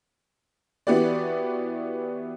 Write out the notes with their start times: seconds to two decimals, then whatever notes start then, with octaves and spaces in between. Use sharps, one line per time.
0.87 E3 B3 F#4 G4 D5